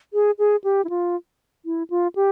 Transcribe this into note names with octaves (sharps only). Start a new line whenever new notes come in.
G#4
G#4
G4
E4
F4
E4
F4
G4